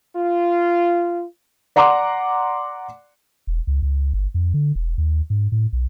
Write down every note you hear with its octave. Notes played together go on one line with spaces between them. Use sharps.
F4
D5 F#5 A#5 C6 D6
E1
C#2
C#2
G1
F2
D3
E1
D#2
G#2
A2
B1